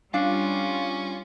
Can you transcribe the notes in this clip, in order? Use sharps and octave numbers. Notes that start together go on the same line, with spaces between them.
G3 C#4 D4 F4 F5